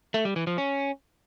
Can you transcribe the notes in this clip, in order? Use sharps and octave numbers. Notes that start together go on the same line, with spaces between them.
A3
G3
E3
F3
C#4